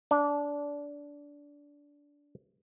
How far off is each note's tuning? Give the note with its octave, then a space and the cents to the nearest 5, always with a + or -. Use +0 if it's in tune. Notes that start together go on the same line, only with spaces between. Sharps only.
D4 -20